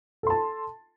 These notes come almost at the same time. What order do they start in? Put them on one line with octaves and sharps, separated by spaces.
A4 C6 A5